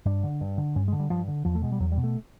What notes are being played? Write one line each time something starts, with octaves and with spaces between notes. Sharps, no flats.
G2 D4
D3
G2
D3
G2 C#4
G#3
D3
G3
G2 F3
D3
E2 F3
A3
B2 G#3
G3
E2 F#3
G3
B2
A3